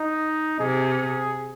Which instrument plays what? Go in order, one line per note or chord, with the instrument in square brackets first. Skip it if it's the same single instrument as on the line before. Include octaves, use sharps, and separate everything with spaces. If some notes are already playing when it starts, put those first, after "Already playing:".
Already playing: [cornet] D#4
[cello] C3 [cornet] G#4